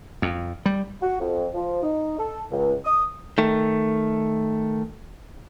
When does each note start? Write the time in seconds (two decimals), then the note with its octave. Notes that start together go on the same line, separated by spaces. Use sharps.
0.22 F2
0.66 G3
1.02 F#4
1.20 F2
1.54 F3
1.83 D#4
2.19 A4
2.51 C#2
2.85 D#6
3.38 D#3 A3